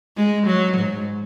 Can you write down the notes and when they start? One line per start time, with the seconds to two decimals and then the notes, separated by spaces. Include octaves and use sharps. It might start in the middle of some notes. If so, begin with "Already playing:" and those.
0.17 G#3
0.47 F#3
0.77 G#2